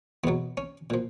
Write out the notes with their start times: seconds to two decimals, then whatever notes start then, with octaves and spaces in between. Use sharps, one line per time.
0.24 E2 B2 F#3 B3
0.57 C#4
0.90 A#2 F3